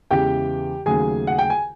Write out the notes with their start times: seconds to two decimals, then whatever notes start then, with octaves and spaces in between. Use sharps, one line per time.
0.11 E2 C#3 E3 G#3 G4 G5
0.86 D#2 C#3 F#3 A3 G#4 G#5
1.27 F#5
1.39 G5
1.50 G#5